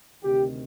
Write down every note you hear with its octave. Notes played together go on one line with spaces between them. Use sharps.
D2 C3 D#3 G4